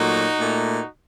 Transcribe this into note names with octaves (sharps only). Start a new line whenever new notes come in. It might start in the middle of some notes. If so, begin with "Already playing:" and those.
Already playing: A#2 F#3 A3 D#4 F#4
A#2 A3